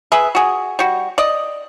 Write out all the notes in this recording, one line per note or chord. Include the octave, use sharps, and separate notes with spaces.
G#4 B4 E5
F#4 G#4
G3 F#4
D5 D#5